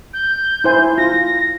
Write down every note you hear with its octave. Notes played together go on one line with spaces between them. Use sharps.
G6
E4 C5 G#5
F4 A#6